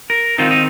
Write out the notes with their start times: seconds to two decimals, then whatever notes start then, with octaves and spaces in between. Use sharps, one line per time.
0.10 A#4
0.38 D#3 C4 D#4 F4
0.51 D#4